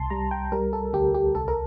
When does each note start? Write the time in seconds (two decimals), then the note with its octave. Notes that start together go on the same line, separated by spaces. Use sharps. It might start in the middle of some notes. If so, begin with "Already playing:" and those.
Already playing: C2 A5 C6
0.10 G3 A#5
0.31 G5
0.52 G3 A#4
0.73 A4
0.93 D2 G4
1.14 G4
1.35 C2 A4
1.48 A#4